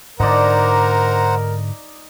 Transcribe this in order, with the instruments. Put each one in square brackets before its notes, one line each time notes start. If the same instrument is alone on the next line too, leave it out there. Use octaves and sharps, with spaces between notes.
[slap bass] G#2 D3 [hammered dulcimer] D#4 D5 [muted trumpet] A#4 [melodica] C5 F#5 A#5